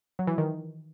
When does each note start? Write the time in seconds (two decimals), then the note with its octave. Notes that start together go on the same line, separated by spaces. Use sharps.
0.19 F#3
0.27 E3
0.38 D#3